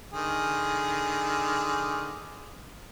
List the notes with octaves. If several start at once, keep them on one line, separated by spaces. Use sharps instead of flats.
D3 D#3 G#4